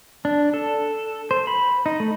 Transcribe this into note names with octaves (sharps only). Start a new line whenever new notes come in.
D4
A4
C5
B5
D#4
A3